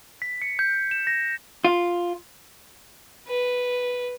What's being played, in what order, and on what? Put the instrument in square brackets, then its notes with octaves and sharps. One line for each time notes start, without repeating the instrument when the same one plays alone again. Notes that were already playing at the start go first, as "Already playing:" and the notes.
[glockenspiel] B6
C#7
G6
E7
A#6
[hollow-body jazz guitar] F4
[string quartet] B4